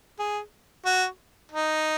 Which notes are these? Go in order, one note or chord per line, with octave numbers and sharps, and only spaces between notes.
G#4
F#4
D#4